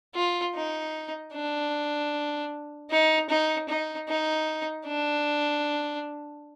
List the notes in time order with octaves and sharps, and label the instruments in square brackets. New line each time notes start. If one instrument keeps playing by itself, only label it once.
[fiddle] F4
D#4
D4
D#4
D#4
D#4
D#4
D4